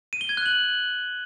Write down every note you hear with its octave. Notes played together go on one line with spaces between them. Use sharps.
D#7
G7
G#6
F#6
F#7